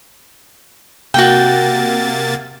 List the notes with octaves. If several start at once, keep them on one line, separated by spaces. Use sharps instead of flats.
C3 A#3 F#4 G5 A6